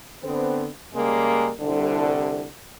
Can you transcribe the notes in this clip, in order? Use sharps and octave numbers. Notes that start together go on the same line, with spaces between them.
D3 B3 C4
C#3 G3 G#3 A#3
C2 D3